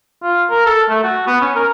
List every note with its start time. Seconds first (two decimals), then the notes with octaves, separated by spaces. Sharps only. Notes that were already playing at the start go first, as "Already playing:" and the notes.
0.23 F4
0.50 A#4
0.66 A4
0.89 A3
1.03 F#4
1.27 B3
1.41 C#4
1.56 A#4